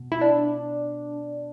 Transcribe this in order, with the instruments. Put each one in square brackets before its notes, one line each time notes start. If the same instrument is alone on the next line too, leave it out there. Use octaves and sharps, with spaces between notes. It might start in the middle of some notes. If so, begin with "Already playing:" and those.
Already playing: [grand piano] B2
[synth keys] E4
D4